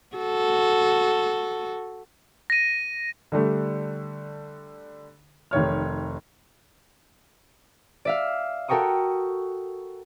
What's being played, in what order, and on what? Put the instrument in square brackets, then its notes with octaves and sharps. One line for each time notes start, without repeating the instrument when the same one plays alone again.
[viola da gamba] F#4 A4
[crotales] A#6 D#7
[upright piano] D3 G3 A3
F1 D#3 C#5 F6
[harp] D5 E5 F5
F#4 A4 A#4 G5 C#6 D#6